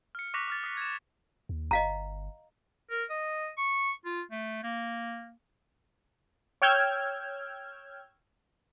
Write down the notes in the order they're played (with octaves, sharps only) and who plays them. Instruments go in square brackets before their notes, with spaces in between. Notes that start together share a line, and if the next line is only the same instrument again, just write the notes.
[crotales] F6 C#7
C#6 D6 F#6 A#6 B6 F7
D6 F6 A6
D#6 B6
G#6 E7
[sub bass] D#2
[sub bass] G1 [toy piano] D#5 F5 A#5
[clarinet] A#4
D#5
C#6
F4
A3
A#3
[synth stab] C#5 G5 E6 F6 G6 G#6